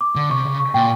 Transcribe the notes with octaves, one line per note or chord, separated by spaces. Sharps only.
D6
D3
C3 C#6
C#3
C#6
A#2 G5